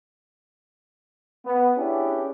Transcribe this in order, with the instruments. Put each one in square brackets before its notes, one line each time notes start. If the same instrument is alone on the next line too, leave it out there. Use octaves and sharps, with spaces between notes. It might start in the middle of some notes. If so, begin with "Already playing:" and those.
[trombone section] B3
C#4 D4 E4 G4 G#4